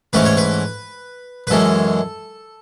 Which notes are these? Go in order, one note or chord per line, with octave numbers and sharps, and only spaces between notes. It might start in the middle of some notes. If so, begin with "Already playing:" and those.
G#2 E3 A3 C#4 B4
C#5
B4
B4
F#2 E3 G#3 C#4 A4